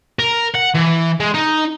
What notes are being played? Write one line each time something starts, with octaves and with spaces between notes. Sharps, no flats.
A#4
F#5
E3
G#3
D#4